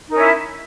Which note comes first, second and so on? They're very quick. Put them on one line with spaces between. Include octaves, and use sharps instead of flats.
D#4 A#4 C#4 E4